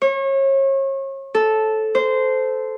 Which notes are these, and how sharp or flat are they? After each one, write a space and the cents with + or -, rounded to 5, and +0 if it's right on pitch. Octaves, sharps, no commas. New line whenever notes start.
C#5 -35
A4 -10
C5 -15